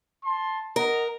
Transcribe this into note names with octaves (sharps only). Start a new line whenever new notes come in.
A5 C6
A#4 D#5 F#5 A#5